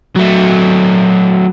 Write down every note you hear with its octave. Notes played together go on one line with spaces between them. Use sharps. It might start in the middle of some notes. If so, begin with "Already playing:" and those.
F#3 A3